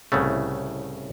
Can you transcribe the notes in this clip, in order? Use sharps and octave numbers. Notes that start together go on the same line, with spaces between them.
C2 A2 C#3 A3